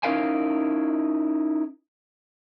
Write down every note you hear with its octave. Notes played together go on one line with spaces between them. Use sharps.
C#4 D#4 E4 A#4 F5 G#5